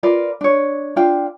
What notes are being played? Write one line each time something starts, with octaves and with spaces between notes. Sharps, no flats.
F4 A#4 B4 D5
D4 C#5
D4 F4 F5 G5